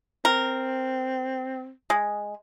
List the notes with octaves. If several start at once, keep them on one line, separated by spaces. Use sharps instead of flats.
C4 A#4
G#3